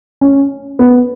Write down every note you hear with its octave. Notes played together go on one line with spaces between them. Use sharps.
C#4
B3